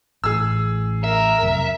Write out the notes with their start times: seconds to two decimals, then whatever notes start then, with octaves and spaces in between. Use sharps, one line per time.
0.24 A1 A2 G#4 E6
1.04 A#4 E5
1.43 F2 C3 F#3